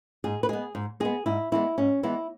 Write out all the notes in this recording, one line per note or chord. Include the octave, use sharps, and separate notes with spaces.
G#2 G#4
B4
G#3 B3 G#4
G#2
G#3 B3 G#4
G#2 E4
E3 G#3 B3 E4
G#2 C#4
E3 G#3 B3 E4